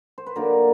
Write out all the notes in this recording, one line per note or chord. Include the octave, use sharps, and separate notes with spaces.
C5
B4
D3 F#3 A#3 D#4 A#4